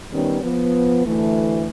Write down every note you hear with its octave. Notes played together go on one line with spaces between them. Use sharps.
D#3 G3 B3 C#4
F3 B3
D2 E3 A3